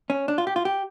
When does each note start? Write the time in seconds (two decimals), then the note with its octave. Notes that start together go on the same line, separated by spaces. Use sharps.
0.10 C#4
0.28 D4
0.38 F4
0.47 G4
0.56 F4
0.65 G4